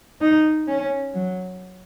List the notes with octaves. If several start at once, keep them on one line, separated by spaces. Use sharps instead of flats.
D#4
C#4
F#3